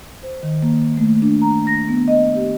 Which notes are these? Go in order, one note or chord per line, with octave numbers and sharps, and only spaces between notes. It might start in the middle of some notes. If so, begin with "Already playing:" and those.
C5
D#3
A#3
A3
D4
A#5
A#6
B3
D#5
G4